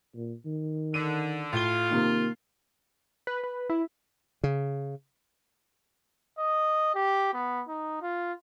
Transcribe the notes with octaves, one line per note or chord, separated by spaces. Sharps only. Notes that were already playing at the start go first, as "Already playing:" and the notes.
A#2
D#3
D3 D#7
A2 F4 G7
C3 D#3 A#3
B4
B4
E4
C#3
D#5
G4
B3
D#4
F4